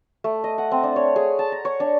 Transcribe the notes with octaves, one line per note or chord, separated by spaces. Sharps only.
A3
D#5
F#5
C4
D4
C#5
G#4
A5
A#5
C#5
D4